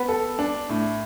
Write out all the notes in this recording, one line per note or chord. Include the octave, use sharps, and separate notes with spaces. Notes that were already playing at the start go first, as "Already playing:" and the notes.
Already playing: B3
A4
D4
A2